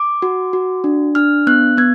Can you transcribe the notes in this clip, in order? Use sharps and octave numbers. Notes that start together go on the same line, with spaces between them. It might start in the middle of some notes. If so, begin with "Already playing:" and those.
Already playing: D6
F#4
F#4
D4
D4 F6
B3 F#6
B3 G#6